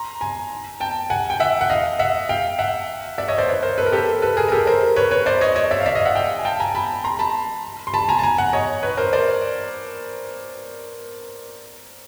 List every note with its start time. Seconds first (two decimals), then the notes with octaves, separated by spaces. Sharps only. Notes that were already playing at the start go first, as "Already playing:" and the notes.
Already playing: A#5 C6
0.21 G#5 A#5
0.80 G5 A5
1.10 F#5 G#5
1.30 G5
1.40 E5 F#5
1.61 F#5
1.70 D#5 F5
1.99 E5 F#5
2.29 F5 G5
2.59 E5 F#5
3.18 D5 E5
3.28 C#5 D#5
3.38 C5 D5
3.48 B4 C#5
3.63 A#4 C5
3.78 A4 B4
3.86 A#4
3.92 G4 A4
4.22 A4 B4
4.37 G#4 A#4
4.48 A#4
4.52 G4 A4
4.67 A#4 C5
4.96 B4 C#5
5.11 B4 C#5
5.26 C5 D5
5.41 C#5 D#5
5.55 C#5 D#5
5.71 D5 E5
5.80 F5
5.86 D5 E5
5.95 D#5 F5
6.05 E5 F#5
6.15 F5 G5
6.39 G#5
6.45 G5 A5
6.60 G#5 A#5
6.75 A5 B5
7.04 A#5 C6
7.19 A5 B5
7.87 C6
7.94 A5 B5
8.09 G#5 A#5
8.19 A5
8.23 G#5 A#5
8.38 F#5 G#5
8.53 C#5 D#5
8.83 B4 C#5
8.97 A#4 C5
9.13 C5 D5